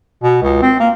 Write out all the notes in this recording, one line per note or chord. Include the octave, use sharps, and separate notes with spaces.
B2
C#2
C4
A#3